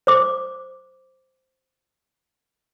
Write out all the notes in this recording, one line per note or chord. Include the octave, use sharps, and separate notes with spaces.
C5 D6